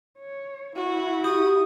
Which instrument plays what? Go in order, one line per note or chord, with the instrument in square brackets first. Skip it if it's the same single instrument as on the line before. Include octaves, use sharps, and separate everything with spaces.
[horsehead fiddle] C#5
[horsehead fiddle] E4 [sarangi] F#4
[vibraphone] G4 [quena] D#6